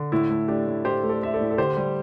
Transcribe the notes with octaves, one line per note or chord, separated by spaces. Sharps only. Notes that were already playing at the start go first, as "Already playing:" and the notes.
Already playing: D3
A2 E4
A3
A3 D4 G4
A2
A2 G4 C5
A3
A4 D5
A3 E5
A4 D5
A2
A4
D3 G4 C5
G3